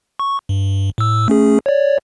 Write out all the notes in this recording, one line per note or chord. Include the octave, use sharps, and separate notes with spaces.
C#6
G2
A2 E6
A3 C#4 G#4
C#5 D5